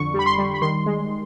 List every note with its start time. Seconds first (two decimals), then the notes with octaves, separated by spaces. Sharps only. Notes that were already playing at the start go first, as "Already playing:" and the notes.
Already playing: F2 D3 C#6
0.14 G3 B5
0.26 C6
0.38 G3
0.54 B5
0.62 D#3 C6
0.86 G#3